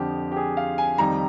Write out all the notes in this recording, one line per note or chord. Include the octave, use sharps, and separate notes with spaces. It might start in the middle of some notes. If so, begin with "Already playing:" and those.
Already playing: F2 D3 F3 G4
G4
G#4
F5
G#5
F2 D#3 G3 A#5